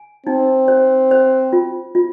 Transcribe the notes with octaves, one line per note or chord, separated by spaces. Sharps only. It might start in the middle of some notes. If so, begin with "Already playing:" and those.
Already playing: G#5
C4 D#4
C5
C5
F4
F4